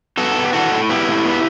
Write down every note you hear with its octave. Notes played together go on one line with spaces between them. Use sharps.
B3 F#4 A4
B3
G4
E3 F#4 A4
A2
B3 E4 G4
A2
B3